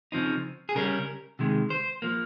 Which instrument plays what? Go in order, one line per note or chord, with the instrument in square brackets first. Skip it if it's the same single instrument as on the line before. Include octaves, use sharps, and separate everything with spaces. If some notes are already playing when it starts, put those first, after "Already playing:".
[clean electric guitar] C#3 F3 C4 D#4
G#4
C#3 G3 C#4 A#4
C3 D#3 G#3
C5
F3 A#3